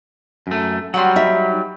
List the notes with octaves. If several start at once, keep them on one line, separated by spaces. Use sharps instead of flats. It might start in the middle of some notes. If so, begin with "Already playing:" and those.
F#2 A3
F#3 G3 F#5 B5 C6
D#4 E5